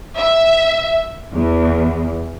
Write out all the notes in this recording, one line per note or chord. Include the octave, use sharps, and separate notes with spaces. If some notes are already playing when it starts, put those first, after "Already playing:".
E5
E2